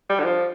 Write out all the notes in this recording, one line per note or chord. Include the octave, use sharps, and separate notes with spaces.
G3
D3
F3